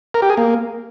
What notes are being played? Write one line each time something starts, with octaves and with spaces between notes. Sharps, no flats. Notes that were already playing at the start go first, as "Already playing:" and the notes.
A#4
G4
G#4
A#3